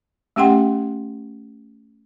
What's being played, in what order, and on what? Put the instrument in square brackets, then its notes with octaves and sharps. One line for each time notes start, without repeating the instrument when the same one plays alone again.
[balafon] A3 C#4 G4 F#5 G5 C6